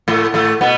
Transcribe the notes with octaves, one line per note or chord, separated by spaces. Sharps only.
A2 A3
A2 A3
B2 B3